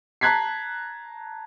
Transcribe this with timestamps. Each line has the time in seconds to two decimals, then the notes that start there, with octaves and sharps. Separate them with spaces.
0.21 A5 A#5 F#6 G#6 B6 C7